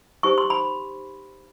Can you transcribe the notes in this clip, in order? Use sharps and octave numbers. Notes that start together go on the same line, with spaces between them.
D#4 G4 C5 C#6
C6
B5